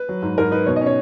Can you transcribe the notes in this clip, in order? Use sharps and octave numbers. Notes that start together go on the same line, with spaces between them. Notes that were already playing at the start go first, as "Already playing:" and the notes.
Already playing: B4
F#3
G#2
G#2 A#4
D#4 B4
B2 C#5
D#5
C#4
C#5